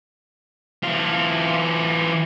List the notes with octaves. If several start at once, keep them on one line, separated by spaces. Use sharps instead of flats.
E3 F4